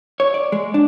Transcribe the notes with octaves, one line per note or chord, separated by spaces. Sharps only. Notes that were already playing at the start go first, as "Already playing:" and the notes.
C#5
D5
G#3
D4